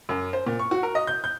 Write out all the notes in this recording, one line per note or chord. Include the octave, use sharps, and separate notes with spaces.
F#2
C5
A#2
C#6
F#4
A#4
D#5
G6
G6